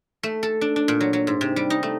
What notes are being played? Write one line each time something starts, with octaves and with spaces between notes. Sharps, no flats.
A3
A4
D4
D4
A#2
F#3
F#3
G#2
C3
G3
D#4
A3